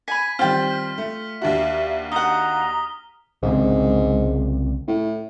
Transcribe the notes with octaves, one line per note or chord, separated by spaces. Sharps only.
G#5 B5 B6 D#7
D#3 G3 C4 F4 G5 F6 B6
A3
D#2 D4 F#4 E5
D#4 F#5 A#5 D#6 G7
C2 G#2 C#3 C4
A2